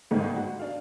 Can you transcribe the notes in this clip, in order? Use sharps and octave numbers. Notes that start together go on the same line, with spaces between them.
G1 G#2 D#3 G#3 C4 F5
F#4
D4 F5